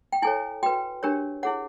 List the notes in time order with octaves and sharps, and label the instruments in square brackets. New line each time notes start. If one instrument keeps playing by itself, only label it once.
[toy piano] G5
E4 A4 C#5 G#5
F#4 B4 G5
D4 G4 A#4 C#5
E4 G#4 C#5 F#5